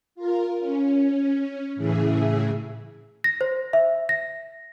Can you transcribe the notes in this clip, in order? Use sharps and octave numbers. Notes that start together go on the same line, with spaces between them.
F4 A#4
C#4
A2 C#3 E3 G#4 E5
A#6
C5
E5
A#6